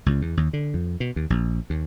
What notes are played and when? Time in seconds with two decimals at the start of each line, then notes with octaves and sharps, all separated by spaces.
0.06 C#2
0.22 E2
0.37 D#2
0.53 D3
0.74 F2
1.00 B2
1.16 D#2
1.30 A#1
1.70 D#2